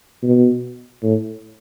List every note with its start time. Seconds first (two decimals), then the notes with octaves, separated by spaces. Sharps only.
0.23 B2
1.03 A2